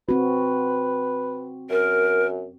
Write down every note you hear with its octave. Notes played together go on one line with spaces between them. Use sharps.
C4 F#4 B4
F#2 A#4